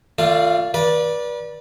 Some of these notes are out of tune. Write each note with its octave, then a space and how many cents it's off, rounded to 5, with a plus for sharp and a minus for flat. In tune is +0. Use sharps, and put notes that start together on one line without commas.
A3 +30 F4 +0 D5 +0
B4 -35 D5 +0